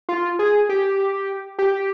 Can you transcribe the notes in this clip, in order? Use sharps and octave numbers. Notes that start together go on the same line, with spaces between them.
F4
G#4
G4
G4